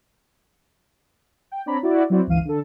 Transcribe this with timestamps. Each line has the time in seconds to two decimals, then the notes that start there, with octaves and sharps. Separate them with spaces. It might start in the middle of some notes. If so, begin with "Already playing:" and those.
1.52 G5
1.66 C4 D4 C#5 D5 A#5 B5
1.83 E4 F#4 D5
2.10 F#3 C4 E4 F#4 C5 D5
2.27 G1 C#2 E3 F5 D#7
2.45 D3 A4